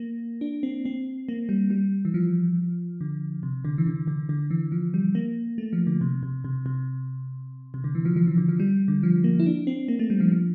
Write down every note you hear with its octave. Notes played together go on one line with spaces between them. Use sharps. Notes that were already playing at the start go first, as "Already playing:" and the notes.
Already playing: A#3
D4
C4
C4
A#3
G3
G3
E3
F3
D3
C3
D3
E3
D3
D3
D3
E3
F3
G3
A#3
A3
F3
D3
C3
C3
C3
C3
C3
D3
E3
F3
F3
E3
D3
F3
G3
D3
F3
A#3
E4
D4
C4
A#3
A3
G3
F3
F3